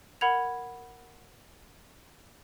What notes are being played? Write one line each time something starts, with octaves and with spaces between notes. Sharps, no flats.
A#4 F#5 B5 G#6 F7